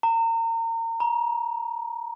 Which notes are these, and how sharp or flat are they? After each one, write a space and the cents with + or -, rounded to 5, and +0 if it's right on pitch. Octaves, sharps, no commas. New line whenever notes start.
A#5 -35
A#5 +35